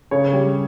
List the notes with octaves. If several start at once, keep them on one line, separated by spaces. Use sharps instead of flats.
C#3 C#5
G3